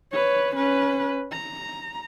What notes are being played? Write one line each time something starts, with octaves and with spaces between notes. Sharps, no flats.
B4 C#5
C#4 B4
A#5